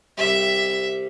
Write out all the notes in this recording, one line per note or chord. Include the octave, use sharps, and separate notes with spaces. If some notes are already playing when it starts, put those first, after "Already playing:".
C2 C3 G3 E5